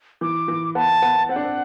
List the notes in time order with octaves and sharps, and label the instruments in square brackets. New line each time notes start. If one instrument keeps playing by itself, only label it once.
[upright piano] E3 [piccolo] D6
[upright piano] E3
[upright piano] B3 [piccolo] A5
[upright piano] B3
[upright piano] C4 [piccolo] F#5
[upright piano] D4
C4